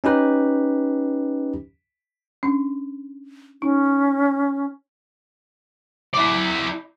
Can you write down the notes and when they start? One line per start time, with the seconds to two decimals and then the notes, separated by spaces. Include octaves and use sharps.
0.04 C#4 D#4 G4 B4
2.43 C#4 D4
3.62 C#4 D#4
6.14 E4 D5